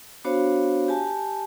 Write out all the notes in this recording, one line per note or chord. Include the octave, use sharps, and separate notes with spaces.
B3 D4 F#4 C5 C#5 F5
G4 G#5 A5